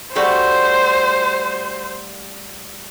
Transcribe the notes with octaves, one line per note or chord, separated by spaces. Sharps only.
G3 A3 F#4 C5